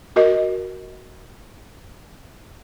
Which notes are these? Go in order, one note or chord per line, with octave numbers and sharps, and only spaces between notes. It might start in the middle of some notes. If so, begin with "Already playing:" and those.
F#4 A#4 D#5